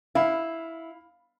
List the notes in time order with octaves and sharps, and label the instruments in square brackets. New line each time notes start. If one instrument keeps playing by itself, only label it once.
[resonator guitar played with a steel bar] E4 [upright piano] F5 B5